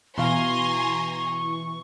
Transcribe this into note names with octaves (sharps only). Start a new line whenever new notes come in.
B2 E3 F5 G#5 A#5 C6 C#6